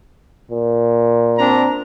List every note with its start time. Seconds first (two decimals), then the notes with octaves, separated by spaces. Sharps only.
0.51 A#2
1.38 C4 D4 A#5